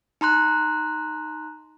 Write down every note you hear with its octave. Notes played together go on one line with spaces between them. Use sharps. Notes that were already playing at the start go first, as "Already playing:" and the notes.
D#4 A#5 C6 F#6